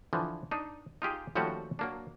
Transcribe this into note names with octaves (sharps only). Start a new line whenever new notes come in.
D3 E3 F3
D4 D#4
D#4 F4 G4 G#4
D#2 F3 G3 A3 C#4 F#4
F#3 A#3 D4